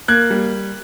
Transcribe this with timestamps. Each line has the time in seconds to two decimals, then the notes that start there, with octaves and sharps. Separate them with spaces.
0.08 A#3 F#6 G#6
0.30 G3